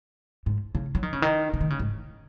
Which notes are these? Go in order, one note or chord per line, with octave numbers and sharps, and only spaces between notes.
G#2
C#3
F#3
D#3
C#3
D#3
C#3
D#3
C#3
G#2